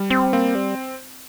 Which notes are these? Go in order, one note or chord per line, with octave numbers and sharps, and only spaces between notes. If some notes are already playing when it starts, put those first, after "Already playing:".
Already playing: G3
C4
A#3 C4
G3